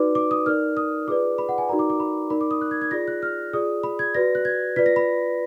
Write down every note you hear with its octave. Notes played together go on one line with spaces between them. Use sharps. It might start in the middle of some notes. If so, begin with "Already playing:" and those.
Already playing: D#4 F#4 B4 D5 D6
D6
D#6
D#4 A#4 D5 F6
D#6
F4 G#4 B4 D5 D6
B5
F#5
G#5
D#4 F#4 A#4 D5 A#5
D6
D6
B5
D#4 A#4 D5 B5
D6
D#6
F#6
G#6
G#6
F4 G#4 D5 A#6
F#6
F6
F4 G#4 D5 D#6
B5
G#6
F#4 B4 D5 A#6
F#6
G#6
F4 B4 D5 B6
A#6
B5